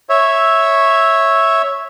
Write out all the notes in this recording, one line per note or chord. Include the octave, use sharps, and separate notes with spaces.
C#5 E5